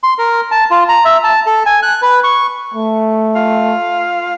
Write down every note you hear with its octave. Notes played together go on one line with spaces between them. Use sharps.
C6
A#4
A5
F4
A#5
E5
A5
A4
G#5
F#6
B4
C#6
A3
F4